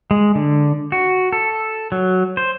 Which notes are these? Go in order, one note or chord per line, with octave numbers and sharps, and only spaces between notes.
G#3
D3
F#4
A4
F#3
C5